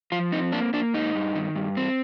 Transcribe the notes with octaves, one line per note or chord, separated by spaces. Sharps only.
F3 F4
C4 D#4
A#3 D4
A#3 D4
G#2 D#4
G2
D#3
G2
C4